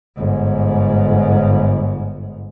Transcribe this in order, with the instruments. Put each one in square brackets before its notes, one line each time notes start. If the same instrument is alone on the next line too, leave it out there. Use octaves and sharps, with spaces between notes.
[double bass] G1 G#2